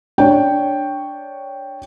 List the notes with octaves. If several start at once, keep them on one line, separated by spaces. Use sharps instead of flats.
D4 C#5 G5